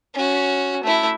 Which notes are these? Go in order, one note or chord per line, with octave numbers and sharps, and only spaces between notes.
C#4 F#4
A3 E4